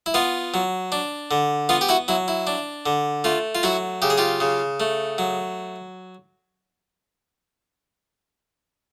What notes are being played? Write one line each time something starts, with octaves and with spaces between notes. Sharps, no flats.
E4
B3 F4
F#3
D4
D3
B3 F4
G4
E4 F#4
F#3 E4
E4
D4
D3
A3 F4
F4
F#3 E4 F#4
C#3 G4
G#4
F4 G4
C#3
A3
F#3